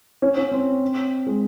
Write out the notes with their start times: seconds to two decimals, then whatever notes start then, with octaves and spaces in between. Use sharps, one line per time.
0.22 C#4
0.37 C#4
0.52 C4
1.27 G#3